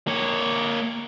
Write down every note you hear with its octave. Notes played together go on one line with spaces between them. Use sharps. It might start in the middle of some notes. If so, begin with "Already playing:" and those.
A#3 C#5